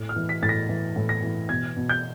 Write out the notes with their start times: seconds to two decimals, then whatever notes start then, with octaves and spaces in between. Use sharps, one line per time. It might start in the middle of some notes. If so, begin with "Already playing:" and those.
Already playing: A2
0.09 F6
0.16 E3
0.29 B6
0.42 A2 A6
0.49 A#6
0.69 E3
0.96 A2
1.09 A#6
1.23 E3
1.49 B2 G#6
1.77 B2
1.89 G6